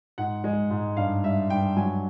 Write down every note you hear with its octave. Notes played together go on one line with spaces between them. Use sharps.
G#2 F#5
G#3
G#2
G2 F5
G3 E5
G2 G5
F#3 G#5